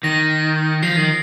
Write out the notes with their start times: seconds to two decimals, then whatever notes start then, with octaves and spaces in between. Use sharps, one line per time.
0.04 D#3 A#6
0.83 F3 C7
0.97 D#3